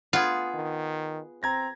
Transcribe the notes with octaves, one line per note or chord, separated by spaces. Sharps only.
B3 F4 G#4
D#3
C4 A#5 G#6 A#6